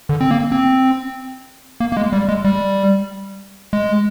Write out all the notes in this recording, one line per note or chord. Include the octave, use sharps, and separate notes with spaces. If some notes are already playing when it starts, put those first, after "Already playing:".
D3
C4
A#3
C4
A#3
A#3
G#3
G3
G#3
G3
G#3